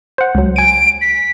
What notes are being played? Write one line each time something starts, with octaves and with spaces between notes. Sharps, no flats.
C5 F#5
C#2 F#3
G#5 D7 D#7
B6